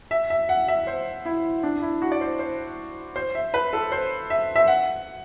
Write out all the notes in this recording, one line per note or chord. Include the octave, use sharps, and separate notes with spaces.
E5
E5
F#5
E5
C5
E4
D4
E4
F#4
D5
C5
C5
C5
E5
B4
A4
C5
E5
E5
F#5